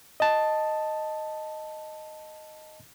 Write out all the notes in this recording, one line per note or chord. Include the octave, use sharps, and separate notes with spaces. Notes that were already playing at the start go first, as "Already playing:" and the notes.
D#5 A5